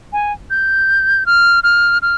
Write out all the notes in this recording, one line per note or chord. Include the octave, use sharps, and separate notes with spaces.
G#5
G6
F6
F6
F6